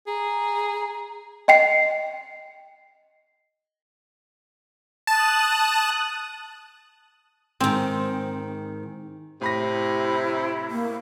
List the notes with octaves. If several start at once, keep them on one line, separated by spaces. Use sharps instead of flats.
G#4 A#5
D#5 G5 C7
A5 D#6 F#6
G#2 D#3 C4
A2 C3 B5 A#6
E4
A#3